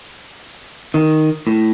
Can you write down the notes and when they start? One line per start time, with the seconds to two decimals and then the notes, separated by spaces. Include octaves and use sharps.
0.94 D#3
1.47 A2